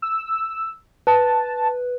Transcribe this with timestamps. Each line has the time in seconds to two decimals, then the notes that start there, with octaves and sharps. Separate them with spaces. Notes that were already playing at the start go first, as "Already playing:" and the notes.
0.02 E6
1.07 B4 A5